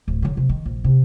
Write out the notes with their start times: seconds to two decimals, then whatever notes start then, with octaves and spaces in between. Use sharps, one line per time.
0.08 D1
0.22 D3 F#3
0.37 C3
0.49 D#3
0.65 A#1
0.84 C3